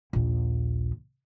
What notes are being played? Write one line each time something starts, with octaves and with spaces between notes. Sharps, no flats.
A#1 D#2